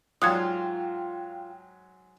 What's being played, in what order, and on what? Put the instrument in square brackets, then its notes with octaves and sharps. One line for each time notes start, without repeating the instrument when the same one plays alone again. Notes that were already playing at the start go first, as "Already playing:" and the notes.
[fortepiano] G#2 F#3 [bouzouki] F4 [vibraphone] G5 [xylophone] D#6 F#6 G#6